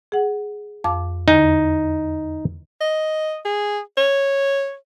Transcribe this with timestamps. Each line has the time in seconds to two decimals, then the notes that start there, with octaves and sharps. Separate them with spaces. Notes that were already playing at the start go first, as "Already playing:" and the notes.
0.12 G#4 F#5
0.84 F2 F5 D6
1.28 E2 D3 D#4
2.81 D#5
3.45 G#4
3.98 C#5